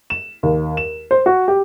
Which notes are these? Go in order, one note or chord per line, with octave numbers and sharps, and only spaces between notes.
E7
D#2
E7
C5
F#4
G4